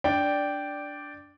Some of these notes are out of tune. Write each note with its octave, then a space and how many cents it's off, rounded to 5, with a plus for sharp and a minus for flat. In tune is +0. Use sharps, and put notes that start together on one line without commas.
D4 -5 D5 +0 G5 -5